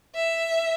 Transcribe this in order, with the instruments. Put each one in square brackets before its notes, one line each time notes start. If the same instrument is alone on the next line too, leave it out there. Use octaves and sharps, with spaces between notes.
[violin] E5